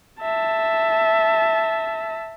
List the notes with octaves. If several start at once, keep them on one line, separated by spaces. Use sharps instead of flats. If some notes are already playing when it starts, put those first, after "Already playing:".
E5 A5